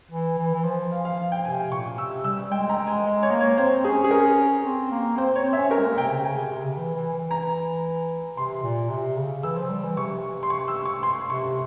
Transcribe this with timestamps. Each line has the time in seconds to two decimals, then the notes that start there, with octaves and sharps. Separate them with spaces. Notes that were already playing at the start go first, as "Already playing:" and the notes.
0.11 E3
0.38 E3
0.54 E3
0.65 F3
0.92 F5
1.05 F5
1.32 G5
1.45 C3 G#5
1.72 A#2 C#6
1.98 C3 E6
2.25 G3 E6
2.51 G#3 G5
2.69 A#5
2.78 G#3
2.87 G#5
3.05 G#3
3.23 C#5
3.31 A#3
3.40 C#5
3.58 C4 C5
3.85 C#4 G#4
4.04 G#4
4.11 A#4
4.64 C4
4.92 A#3
5.17 C4 C5
5.32 C4
5.36 C#5
5.44 C4
5.53 C#4 E5
5.71 C#4 A#4
5.79 G#3
5.85 A#3
5.98 C3 G5
6.10 C#3
6.24 C#3 G#5
6.38 C3
6.50 C3
6.64 C#3
6.77 E3
6.96 E3
7.13 E3
7.31 A#5
8.37 C3 C6
8.63 A#2
8.90 C3
9.17 C#3
9.43 E3 E6
9.56 F3
9.70 G3
9.84 E3
9.97 C3 C#6
10.43 C6
10.50 C#6
10.68 E6
10.85 C#6
11.03 C6
11.30 C3 C#6